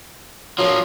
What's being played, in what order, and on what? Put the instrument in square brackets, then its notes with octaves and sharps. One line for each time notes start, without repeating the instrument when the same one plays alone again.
[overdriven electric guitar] F3 A#3 [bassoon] F#3